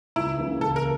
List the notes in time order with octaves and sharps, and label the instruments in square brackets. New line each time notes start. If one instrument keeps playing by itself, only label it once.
[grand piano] C#2 [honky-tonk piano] E4
[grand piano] C#3 E3 A#3 C#4
[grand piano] C#2 [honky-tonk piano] A4
[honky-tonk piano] A#4